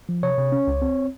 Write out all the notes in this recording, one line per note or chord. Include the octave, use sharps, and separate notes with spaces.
F3
C3 C#5
C3
C#4
C#2
C4